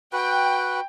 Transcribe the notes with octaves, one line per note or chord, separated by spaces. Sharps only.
F#4 B4 G5